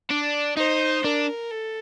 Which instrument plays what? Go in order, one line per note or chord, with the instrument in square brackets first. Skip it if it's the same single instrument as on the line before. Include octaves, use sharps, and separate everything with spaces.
[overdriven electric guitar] D4
[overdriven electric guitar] D#4 [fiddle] C5
[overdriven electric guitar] D4 [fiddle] A#4
[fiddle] A4